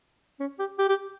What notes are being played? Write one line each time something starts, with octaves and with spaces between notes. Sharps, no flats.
C#4
G4
G4
G4